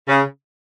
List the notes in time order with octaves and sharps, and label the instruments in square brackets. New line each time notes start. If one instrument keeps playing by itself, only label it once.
[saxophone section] C#3